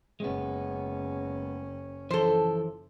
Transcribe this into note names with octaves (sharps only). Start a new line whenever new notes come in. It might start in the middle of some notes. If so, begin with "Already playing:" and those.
F#1 G#3 B3 C#4
E3 F3 A4 C5